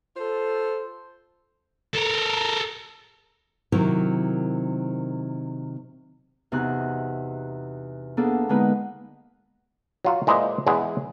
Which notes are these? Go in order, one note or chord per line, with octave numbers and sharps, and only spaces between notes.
F4 A4 C5
A4 A#4
C3 D#3 F#3 C4 E4 A#4
E2 C3 D#4 F#4 C6 F#6
A#3 B3 D4 G#4 A4
D3 G#3 A#3 B3 D#4 B4
F#3 F4 F#4
A#2 G#3 E4 B4 C5 D#5
E2 G#3 G#4 E5 F#5 G#5